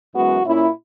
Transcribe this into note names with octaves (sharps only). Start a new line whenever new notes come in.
F#2 E3 G#3 B3 F#4
A#2 A#3 C#4 E4